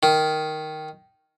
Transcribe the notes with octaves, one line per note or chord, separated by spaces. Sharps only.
D#3